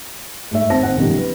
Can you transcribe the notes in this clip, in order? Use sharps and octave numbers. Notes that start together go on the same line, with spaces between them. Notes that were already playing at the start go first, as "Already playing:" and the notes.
G#2 A3 E5
G#1 C4 A5 A#6
G#1 C4 F#5
B1 F#2 D#3 F3 G3
B4